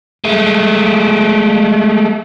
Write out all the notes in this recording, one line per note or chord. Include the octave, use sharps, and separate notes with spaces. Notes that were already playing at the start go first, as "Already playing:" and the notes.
G#3 A3